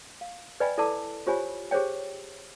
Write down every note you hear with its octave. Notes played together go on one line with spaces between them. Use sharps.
F5
B4 D5 D#5 G5 G#5 B5
E4 A4 D5 A5 D6 E6
F4 G4 C5 C#5 G#5 B5
G4 G#4 C5 C#5 G5